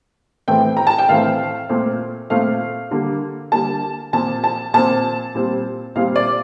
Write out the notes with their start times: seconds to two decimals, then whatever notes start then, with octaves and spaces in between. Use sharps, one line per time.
0.48 A2 E3 A3 C4 G5
0.77 A#5
0.87 A5
0.98 G5
1.09 A2 E3 A3 C4 F5
1.69 A#2 A3 C4
2.30 A#2 A3 C4 F5
2.91 D3 G3 A#3
3.52 D3 G3 A#3 A5
4.13 A#2 F3 C4 A5
4.44 A5
4.74 A#2 F3 C4 A5
5.35 A#2 G3 C4
5.96 A#2 G3 C4 F5
6.16 D5